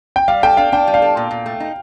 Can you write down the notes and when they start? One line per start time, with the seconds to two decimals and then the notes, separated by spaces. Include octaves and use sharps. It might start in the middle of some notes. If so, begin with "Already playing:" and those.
0.16 G5
0.28 G3 F5
0.43 A4 G5
0.57 D4 F5
0.72 D4 G5
0.87 G3
0.94 F5
1.02 A4
1.17 A#2
1.31 A#2
1.46 A3
1.60 D#4